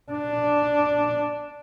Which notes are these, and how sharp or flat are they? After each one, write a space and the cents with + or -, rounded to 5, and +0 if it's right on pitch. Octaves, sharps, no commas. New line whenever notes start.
D4 +0